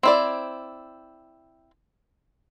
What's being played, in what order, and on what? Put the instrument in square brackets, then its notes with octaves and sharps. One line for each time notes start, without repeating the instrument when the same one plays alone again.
[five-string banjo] C4 E4 D5